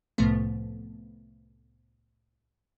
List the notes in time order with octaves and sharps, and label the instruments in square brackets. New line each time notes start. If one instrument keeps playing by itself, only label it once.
[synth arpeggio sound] C2 A2 C3 F3 A3 B3